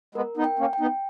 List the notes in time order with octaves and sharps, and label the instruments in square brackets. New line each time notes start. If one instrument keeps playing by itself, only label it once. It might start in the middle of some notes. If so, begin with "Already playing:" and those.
[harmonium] G#3 B3 [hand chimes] A#4
[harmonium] B3 D#4
[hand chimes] G5
[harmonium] A#3 C#4
[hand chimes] G5
[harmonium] B3 D#4